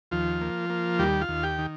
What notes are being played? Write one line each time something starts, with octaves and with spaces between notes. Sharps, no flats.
D#2 F3 F4
A#3
A#3
D#2 G3 G4
F4 F5
D#2
G4 G5
D#3